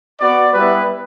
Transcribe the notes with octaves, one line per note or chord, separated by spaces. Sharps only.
B3 F#4 D5
G3 B3 E4 B4